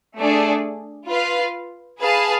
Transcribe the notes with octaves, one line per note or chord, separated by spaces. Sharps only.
A3 D4 G#4 D5
F4 B4 F5
G#4 B4 F5 A5